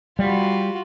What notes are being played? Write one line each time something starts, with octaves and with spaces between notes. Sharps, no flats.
G3 F4 F#4